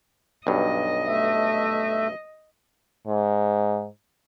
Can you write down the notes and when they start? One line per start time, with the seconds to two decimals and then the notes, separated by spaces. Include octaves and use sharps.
0.47 B1 G2 D#5
1.07 A3 E5
3.07 G#2